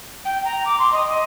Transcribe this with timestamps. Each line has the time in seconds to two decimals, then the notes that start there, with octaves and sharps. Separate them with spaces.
0.25 G5
0.45 A#5
0.65 D6
0.78 C6
0.92 D#5
1.06 D#5